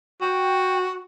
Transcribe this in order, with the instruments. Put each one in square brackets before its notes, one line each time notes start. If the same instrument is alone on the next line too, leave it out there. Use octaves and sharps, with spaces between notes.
[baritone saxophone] F#4 [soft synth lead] G5